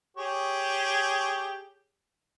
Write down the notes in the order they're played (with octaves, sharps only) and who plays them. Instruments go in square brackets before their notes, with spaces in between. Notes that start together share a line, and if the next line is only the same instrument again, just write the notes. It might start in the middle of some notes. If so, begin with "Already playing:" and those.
[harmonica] G4 G#4 C#5